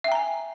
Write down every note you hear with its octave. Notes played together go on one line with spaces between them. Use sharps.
E5 G5 G#5 A#5